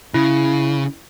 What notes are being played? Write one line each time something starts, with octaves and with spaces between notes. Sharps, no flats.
C#3 E4